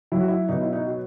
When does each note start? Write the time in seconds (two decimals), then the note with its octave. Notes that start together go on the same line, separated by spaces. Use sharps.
0.12 F#3 E4
0.20 F#4
0.28 E4
0.49 B2 D#4
0.61 E4
0.73 D#4
0.87 F#4